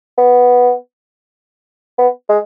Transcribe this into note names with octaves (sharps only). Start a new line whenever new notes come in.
B3
B3
G#3